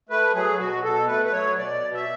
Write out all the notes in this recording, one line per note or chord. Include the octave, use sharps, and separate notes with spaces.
A3 B4
F#3 G#4
B2 F#4
B2 A4
A3 B4
B4
F#3 C#5
B2 D5
B2
E5